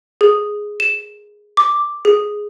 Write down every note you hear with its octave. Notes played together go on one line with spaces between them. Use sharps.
G#4
E7
D6
G#4